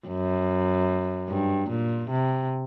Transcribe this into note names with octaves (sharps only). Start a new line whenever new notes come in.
F#2
G2
A#2
C3